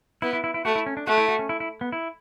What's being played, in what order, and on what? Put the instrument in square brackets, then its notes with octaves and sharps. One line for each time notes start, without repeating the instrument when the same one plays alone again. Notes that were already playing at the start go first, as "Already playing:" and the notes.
[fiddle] B3 [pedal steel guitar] E4
[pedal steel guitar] E4
E4
E4
[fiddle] A3 [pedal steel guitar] F#4
[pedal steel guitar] E4
C#4
D4
[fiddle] A3 [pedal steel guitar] F#4
[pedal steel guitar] E4
F#4
C#4
E4
E4
B3
E4